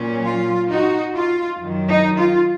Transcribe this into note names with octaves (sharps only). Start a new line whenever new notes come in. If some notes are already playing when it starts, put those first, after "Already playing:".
Already playing: A#2 F#3 C#4
F4
D#4 F#4
F4
F#2 D#3 F#3
D#4
F4